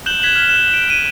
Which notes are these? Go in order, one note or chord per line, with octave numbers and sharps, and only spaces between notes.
F#6 G6 E7 F#7 G7
F#6 G#6 B6 E7 F#7
F6 G7
F#6 E7
D7
D#7